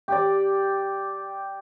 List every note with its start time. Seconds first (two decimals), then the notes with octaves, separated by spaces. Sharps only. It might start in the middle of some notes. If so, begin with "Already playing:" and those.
0.08 G4 D5